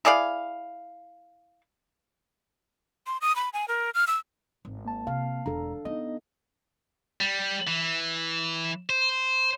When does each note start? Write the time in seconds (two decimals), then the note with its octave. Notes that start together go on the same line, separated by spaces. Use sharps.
0.05 E4 G#4 D5 F5
3.07 C6
3.21 D#6
3.36 B5
3.53 G#5
3.68 A#4
3.94 F6
4.07 E6
4.65 G#1
4.85 A#3 A5
5.07 C3 F5
5.46 E1 D4 A4 A#5
5.85 B3 D#4 D#5
7.21 G3
7.67 E3
8.89 C5